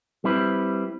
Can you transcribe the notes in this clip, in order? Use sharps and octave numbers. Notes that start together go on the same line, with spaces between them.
G3 C4 E4 B4